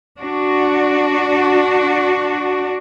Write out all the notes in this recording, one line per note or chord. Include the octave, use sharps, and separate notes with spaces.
D4 F#4